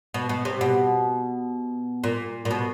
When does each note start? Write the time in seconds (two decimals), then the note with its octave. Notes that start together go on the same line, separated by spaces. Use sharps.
0.14 B2
0.29 B2
0.45 C3
0.61 B2
2.04 A#2
2.45 A#2
2.51 B2